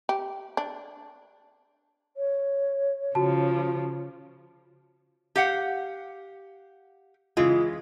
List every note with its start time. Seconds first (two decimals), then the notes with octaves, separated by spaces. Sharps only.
0.09 G4
0.57 D4
2.17 C#5
3.15 C#3 F3 F#4 A5
5.36 G4 F5 F#5
7.37 C#3 E3 G#3 F4